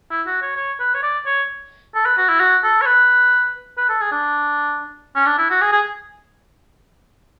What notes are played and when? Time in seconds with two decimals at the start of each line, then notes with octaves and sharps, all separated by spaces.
0.11 E4
0.27 F#4
0.42 C#5
0.56 C#5
0.80 B4
0.94 C#5
1.03 D5
1.26 C#5
1.95 A4
2.06 B4
2.18 F#4
2.29 E4
2.40 F#4
2.64 A4
2.82 C#5
2.86 B4
3.78 B4
3.89 A4
4.00 G#4
4.12 D4
5.16 C#4
5.26 D4
5.38 E4
5.50 F#4
5.61 G#4
5.72 G#4